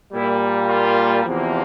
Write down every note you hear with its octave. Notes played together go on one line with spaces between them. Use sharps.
A#2 G3 A#3 E4
F4
E2 C3 F3 A#3